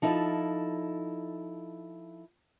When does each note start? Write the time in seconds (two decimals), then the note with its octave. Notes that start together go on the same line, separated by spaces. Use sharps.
0.02 F3 D#4 E4 A4